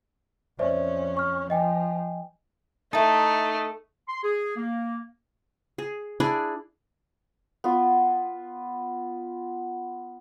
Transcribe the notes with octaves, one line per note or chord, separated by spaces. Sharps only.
F2 C#4 C5 D5 E5
C#6 F6
F3 D#5 G5 G#5
A3 D#4 E4 A5
C6
G#4
A#3
G#4
D4 E4 G#4 D5
B3 F4